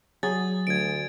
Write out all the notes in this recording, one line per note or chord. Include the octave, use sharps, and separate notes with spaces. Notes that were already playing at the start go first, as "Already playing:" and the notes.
F#3 G#4 A6
D2 G#6 D7